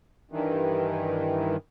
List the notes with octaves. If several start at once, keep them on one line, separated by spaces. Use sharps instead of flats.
G2 D#3 E3